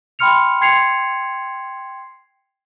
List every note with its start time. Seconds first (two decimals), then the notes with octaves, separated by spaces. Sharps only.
0.19 G5 B5 C6 F6 C#7 F7
0.61 G5 C6 G#6 C7 C#7 F7